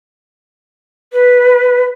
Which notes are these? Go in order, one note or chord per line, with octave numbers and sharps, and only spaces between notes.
B4